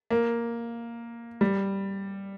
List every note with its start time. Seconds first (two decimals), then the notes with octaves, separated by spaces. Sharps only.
0.11 A#3
1.41 G3